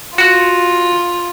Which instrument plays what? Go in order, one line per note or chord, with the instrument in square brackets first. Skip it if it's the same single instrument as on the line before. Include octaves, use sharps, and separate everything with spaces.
[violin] F4 [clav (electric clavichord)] F#4